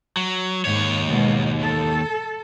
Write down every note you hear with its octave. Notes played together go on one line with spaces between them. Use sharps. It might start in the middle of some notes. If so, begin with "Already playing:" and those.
F#3
D#2 G#2 C#5
G#2 B2 G#3
A4